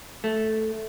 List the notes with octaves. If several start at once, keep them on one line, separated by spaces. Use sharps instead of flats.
A3